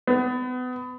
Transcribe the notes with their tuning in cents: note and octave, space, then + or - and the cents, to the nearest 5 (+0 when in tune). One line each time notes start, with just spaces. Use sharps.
B3 +30